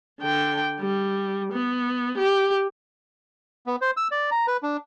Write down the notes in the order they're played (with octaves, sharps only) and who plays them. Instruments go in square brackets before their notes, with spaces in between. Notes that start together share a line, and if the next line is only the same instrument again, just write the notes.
[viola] D3 G5
G3
B3
G4
[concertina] B3
C5
E6
D5
A#5
B4
D4